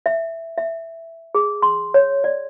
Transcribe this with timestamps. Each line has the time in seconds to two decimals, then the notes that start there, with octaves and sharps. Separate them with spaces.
0.06 E5
0.58 E5
1.35 G#4
1.62 C6
1.94 C#5
2.24 D5